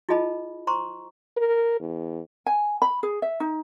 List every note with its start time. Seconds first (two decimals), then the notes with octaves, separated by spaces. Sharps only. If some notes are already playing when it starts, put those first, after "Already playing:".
0.09 E4 F4 G#4 D#5 A5 B5
0.67 C5 A#5 C6 C#6
1.37 A#4
1.80 E2
2.46 G#5
2.82 B5
3.03 G#4
3.22 E5
3.40 D#4